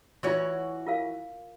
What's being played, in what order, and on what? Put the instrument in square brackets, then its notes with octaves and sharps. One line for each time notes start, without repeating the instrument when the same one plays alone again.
[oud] E3 F#4 C#5 [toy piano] F4 C#6
[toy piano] F4 A#4 F5